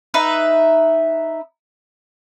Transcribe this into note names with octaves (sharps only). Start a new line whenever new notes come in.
D#4 B4 E5